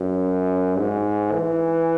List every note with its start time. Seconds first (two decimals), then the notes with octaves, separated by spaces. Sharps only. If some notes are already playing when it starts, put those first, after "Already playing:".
Already playing: F#2
0.79 G#2
1.33 E3